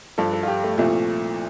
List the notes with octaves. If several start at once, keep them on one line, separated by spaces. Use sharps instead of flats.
G2 F3 A4
A4
F4
G4
A3
C2 A#2 F3 A3